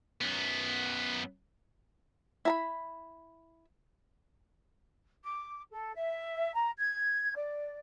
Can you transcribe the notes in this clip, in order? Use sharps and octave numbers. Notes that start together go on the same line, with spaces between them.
F#2 B3
E4 A#5 B5
D6
A4
E5
A#5
G#6
D5